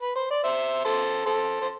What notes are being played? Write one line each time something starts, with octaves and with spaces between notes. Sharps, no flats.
B4
C5
D5
C5 E5
A4 C5
A4 C5
C5